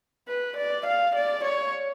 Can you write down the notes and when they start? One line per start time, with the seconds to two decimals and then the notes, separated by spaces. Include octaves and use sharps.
0.28 B4
0.57 D5
0.86 F5
1.15 D5
1.45 C#5